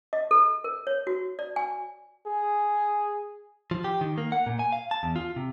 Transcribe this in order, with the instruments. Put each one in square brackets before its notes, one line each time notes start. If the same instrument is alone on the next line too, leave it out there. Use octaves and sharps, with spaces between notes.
[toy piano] D#5
A4
A#4
C#5
F#4
D5
G#5
[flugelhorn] G#4
[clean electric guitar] F3
G4
D#3
A#3
F#5
A#2
G#5
F5
A5
E2
F4
C3